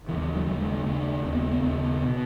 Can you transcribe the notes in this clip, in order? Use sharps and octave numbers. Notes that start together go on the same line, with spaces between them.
D#2 C#3 E3
E3
F#3
D#2 C#3 F#3
G#3
A3
D#2 C#3 A3
D#2 C#3 C#4
B3
A3
B3
D#2 C#3 B3
B2